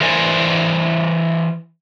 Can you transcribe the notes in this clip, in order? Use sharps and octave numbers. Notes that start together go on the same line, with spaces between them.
E3 A#4 C5 D5 G#5